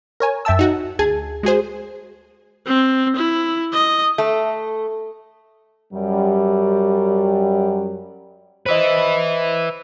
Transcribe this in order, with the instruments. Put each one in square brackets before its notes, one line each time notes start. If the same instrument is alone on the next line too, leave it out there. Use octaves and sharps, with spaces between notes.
[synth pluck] A#4 C#5 G#5
F#2 E5 G5 A5 E6
D#4 F#4
D2 G#4 A5 G#6
G#3 F#4 G#4 C5
[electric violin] C4
E4
D#5
[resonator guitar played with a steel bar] A3
[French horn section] F#2 G3
[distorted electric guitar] B4 E5 [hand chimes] C5 D#5